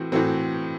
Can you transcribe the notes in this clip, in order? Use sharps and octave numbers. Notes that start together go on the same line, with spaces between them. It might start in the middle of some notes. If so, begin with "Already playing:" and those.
Already playing: A2 E3 C4 F#4
A2 E3 A3 C4 F#4